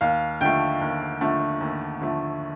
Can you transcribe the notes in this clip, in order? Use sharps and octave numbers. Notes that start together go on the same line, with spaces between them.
D#2 F5
D3 F3 A3 G5
D#2
D3 F3 A3
D#2
D3 F3 A3